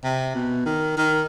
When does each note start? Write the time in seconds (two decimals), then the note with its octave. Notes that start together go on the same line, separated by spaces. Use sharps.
0.04 C3
0.35 B2
0.66 D#3
0.98 D#3